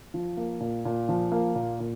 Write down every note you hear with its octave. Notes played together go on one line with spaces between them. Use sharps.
F3
A#3
A#2
A#2
F3
A#3
A#2
A#2